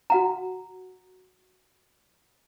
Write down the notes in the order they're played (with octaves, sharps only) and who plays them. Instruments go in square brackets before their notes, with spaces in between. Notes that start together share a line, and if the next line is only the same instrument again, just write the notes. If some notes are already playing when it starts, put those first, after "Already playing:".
[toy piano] F#4 F#5 A#5